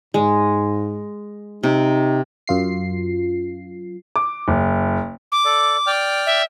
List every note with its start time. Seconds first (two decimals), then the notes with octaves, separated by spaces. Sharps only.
0.14 G#2 G#3
1.63 C3 D#4
2.48 F#2 F4 C7
4.16 D6
4.48 F#1
5.32 D6
5.45 A4 D5
5.87 D5 G5 F6
6.26 E5